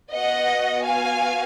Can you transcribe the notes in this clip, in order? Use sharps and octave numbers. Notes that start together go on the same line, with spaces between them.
B3 F#4 D#5 F#5
F5 G#5